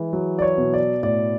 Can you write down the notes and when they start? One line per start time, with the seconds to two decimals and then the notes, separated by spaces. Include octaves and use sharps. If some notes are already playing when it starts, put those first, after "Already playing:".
Already playing: E3 G#3
0.13 F#3
0.39 D5
0.42 C#5
0.58 B2
0.74 D5
1.03 A2 D5